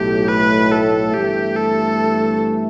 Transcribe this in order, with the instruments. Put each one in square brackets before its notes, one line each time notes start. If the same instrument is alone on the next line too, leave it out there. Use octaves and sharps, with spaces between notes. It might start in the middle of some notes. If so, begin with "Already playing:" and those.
Already playing: [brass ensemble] B1 A2 A3 [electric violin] G4
[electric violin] B4
A4
[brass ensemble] G1 G2 E3 A3 [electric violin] G4
[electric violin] A4